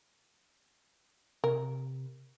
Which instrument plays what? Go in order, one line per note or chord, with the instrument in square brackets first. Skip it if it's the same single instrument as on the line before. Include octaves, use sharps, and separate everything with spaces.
[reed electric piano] C3 [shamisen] A#4